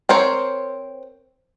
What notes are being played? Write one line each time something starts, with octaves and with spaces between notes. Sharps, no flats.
C4 A#4 C5 C#5